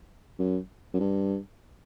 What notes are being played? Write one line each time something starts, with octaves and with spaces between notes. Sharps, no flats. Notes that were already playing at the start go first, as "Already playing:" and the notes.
F#2
F#2
G2